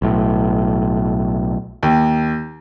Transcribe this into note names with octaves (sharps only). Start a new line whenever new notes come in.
B1 A2
D#2